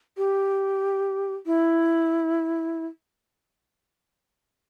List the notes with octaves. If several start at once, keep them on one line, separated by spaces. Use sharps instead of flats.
G4
E4